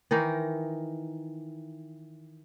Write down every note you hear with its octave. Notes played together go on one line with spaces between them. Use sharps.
D#3 E3 D#4 A#4